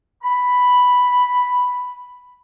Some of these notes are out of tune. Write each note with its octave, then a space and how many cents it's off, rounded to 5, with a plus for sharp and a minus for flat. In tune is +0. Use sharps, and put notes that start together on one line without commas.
B5 +0